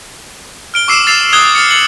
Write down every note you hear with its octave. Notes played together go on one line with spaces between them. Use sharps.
F6 D7 G7
C#6 D6 E6 C7 D7 E7
E6 A6 C7 E7 F7
D#6 F#6 G#6 G7
F6 A6 C#7
A6 C#7 F#7